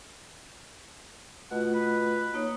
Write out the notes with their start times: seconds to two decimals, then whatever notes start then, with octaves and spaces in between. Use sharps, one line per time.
1.51 B2 A3 F4 F#5
1.74 B4
2.34 A#3 D#4 C#5